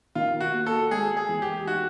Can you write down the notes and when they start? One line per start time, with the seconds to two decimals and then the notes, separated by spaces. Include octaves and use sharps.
0.15 D#3 F4
0.41 F#4
0.53 A#3
0.66 A4
0.91 G#3 G#4
1.17 G#4
1.29 E2
1.42 G4
1.67 D#4 F#4